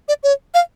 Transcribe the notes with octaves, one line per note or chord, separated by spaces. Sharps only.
D5
C#5
F5